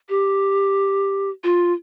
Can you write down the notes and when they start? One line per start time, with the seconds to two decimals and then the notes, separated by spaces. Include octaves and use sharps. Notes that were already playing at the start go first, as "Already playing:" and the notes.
0.09 G4
1.44 F4